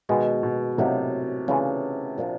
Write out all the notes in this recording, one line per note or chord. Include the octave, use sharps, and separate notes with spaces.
B2 D#3 G#3 B3
B2
A2 C3 F#3 A#3 D#4 G4
C#3 E3 A3 D4 F4
A#2 F3 A#3 D4